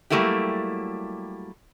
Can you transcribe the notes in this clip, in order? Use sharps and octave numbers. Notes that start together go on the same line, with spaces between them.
F#3 G3 A3 A#3 E4 G4